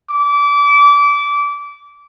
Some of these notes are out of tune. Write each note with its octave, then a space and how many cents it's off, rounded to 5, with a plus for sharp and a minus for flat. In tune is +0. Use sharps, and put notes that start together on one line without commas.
D6 -25